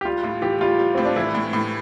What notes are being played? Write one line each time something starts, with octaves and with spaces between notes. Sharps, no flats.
G4
G3 F4
A2 F4
E3 G4
G3 F4
G3
A2 C4
D4
E3 E4
A2
A2